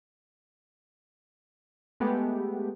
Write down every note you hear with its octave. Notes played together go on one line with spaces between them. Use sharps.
G#3 A3 B3 G4